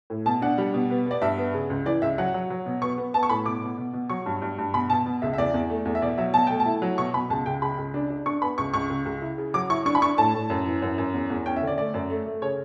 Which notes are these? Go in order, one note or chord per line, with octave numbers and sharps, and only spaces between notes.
A2
B2 A5
D4 F#5
G3
B2
B3
B3 D5
G2 E5
B3
C#3
C#2
E3 D5
C#2 E5
F#3 F#5
F#3
F#3
B2
B3 C#6
B3
B3 A5
C#6
A2 B5
B2 D6
B2
B2
B2
F#3 C#6
G2
G2
G2
B2 B5
B2 A5
B2
C#2 E5
E5
E2 D5
E2
A3
E2
E5
B2 D5
F#3 E5
B2 A5
A3 G5
A5
E4
F#3
B2 C#6
B2 B5
C#2 A5
C#2 G5
C#3 B5
C#2
D4
D4
D4 C#6
B3 B5
C#2 C#6
C#2 C#6
C#2
C#2
E4
C#3
F#3 D6
E4 C#6
D4 C#6
B5
D4 C#6
A2 A5
A2
F#2
E3
F#2
F#2
E2
E2
C#4 G5
E5
D3
D5
A3 D5
F#2
A3
A3
C#3 C#5